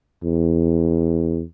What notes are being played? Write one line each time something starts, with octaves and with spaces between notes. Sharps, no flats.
E2